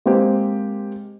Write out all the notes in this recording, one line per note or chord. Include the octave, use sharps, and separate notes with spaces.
G#3 A#3 C4 G4 C5